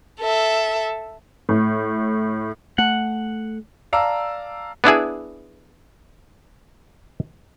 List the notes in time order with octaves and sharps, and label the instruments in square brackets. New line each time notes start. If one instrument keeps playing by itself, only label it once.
[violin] A4 E5
[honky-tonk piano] A2
[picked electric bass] A3 [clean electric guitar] F#5
[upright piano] D5 F5 A5 A#5 E6
[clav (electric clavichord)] B3 D4 E4 G#4